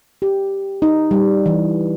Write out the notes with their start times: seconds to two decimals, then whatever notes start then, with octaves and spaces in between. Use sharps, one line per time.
0.22 G4
0.82 D#4
1.11 G3
1.46 E3